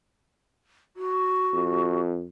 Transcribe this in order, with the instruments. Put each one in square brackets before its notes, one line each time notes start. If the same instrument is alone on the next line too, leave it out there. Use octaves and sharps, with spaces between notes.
[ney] F#4
[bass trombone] F2